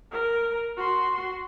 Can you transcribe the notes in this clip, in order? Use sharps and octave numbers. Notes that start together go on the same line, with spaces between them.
A#4
F#4 C6